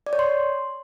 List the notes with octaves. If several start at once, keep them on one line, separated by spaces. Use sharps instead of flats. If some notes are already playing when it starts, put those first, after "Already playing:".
D5
C#5
C6